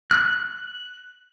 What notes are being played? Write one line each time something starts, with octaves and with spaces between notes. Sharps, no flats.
F#6